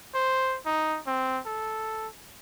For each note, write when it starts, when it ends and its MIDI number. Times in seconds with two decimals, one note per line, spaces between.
0.15 0.57 72
0.66 0.99 63
1.07 1.40 60
1.46 2.08 69